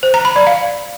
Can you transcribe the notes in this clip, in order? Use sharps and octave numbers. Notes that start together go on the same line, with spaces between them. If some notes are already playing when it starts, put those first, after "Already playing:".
C5
A#5
B5
D5
F5